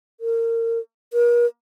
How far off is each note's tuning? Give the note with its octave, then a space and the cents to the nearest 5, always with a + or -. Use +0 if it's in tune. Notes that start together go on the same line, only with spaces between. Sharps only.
A#4 -25
A#4 +40